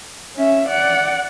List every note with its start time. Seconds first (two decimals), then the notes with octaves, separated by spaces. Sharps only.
0.35 C#4 E5
0.68 D5 F#5